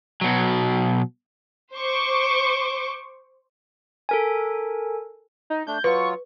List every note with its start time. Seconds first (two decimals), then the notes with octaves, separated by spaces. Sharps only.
0.21 B2 F#3
1.75 C5 C#6 D6
4.09 A4 A#4 G#5
5.50 D#4
5.67 A3 D4 G6
5.84 F#3 F4 B4 C#6